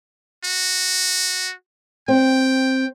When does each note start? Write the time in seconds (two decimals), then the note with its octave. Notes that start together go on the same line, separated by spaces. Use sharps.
0.44 F#4
2.08 C4 G5